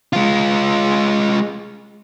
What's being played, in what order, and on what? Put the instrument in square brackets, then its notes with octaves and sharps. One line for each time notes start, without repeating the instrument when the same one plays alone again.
[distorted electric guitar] G#3 F4